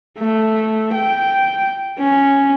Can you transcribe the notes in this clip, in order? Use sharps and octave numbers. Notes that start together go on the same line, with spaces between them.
A3
G5
C#4